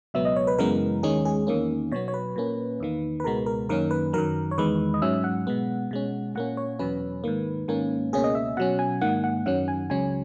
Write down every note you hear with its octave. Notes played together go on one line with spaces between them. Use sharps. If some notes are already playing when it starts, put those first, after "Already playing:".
C#2 B2 F#3 B3 E5
D#5
C#5
B4
F#2 C#3 E3 G#3 B3 A#4
D#2 D#3 G#3 C#4 G#4
G#4
E2 D#3 A#3 C#4
B2 F#3 B3 C#5
C#5
B4
A#2 A#3 C#4
E2 D#3 A#3
B4
C#2 B2 G#3 B3 A#4
A#4
F#2 D#3 A#3 C#4 A#4
B4
F#2 D#3 F#3 A#4
C#5
E2 D#3 G#3 B4
D#5
G#2 F#3 C#4 E5
F#5
B2 G#3 B3
B2 G#3 C#4
A#2 A#3 C#4 F#5
C#5
E2 B2 F#3 C#4 B4
G#2 D#3 A#3
G#2 D#3 A#3 C#4
C#2 B2 A#3 C#4 G#4
D#5
E5
B2 F#3 C#4 F#5
G#5
G#2 D#3 A#3 F#5
F#5
F#2 D#3 F#3 C#4 F#5
G#5
C#2 C#3 F#3 C#4 G#5